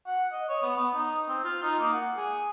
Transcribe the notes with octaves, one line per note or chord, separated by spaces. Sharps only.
F#5
D#5
C#5
B3
B3
D#4
C4
F4
D#4
A#3
F#5
G#4